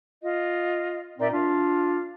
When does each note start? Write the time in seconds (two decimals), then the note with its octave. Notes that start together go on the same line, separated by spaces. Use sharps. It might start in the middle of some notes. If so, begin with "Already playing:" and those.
0.23 F4 D#5
1.19 A#2 C4 D#4 A#4 D5 E5
1.33 D4 F4 F5